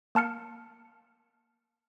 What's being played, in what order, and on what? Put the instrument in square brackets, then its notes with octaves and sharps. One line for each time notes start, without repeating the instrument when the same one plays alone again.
[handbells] A#3 A5 F6 C#7